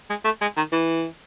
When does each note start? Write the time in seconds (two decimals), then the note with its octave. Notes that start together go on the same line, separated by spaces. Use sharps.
0.10 G#3
0.24 A3
0.41 G#3
0.57 D#3
0.72 E3